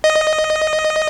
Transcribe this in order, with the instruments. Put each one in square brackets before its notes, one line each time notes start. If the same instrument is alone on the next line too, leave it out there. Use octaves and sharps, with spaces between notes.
[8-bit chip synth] D#5